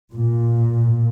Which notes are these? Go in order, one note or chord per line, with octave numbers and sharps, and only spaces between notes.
A#2